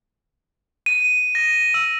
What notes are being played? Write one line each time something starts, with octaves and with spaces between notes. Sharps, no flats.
D#7
A#6
E6